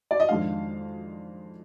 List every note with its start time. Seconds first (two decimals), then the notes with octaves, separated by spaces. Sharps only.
0.11 D5
0.20 D#5
0.29 F2 D#3 G#3 D4 F5